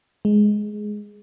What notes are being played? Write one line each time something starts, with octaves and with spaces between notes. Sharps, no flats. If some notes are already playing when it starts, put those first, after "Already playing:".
G#3